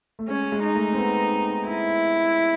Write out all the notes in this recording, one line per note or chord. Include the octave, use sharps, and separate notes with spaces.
A3
G#3 C#4
G#3
D#4
A3
C4
B3
E4